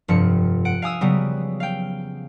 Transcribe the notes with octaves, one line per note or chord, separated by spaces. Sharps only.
F1 G2 F3 C#7
F#5 D7
F5 G#5 D#6 E6
C#3 F#3 G3 B3
F5 G5